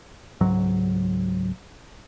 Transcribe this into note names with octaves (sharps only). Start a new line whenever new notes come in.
C#2 G#2 F#3